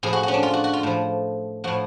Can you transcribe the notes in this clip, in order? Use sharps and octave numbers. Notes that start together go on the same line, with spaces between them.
A2 F3 G#4
F#4
C#4 F#4
D4
F4
F#4
F#4
F4
A2 F3
A2 F3 F#4